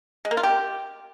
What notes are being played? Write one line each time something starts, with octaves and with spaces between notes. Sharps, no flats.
G#3
A#3
F4
G4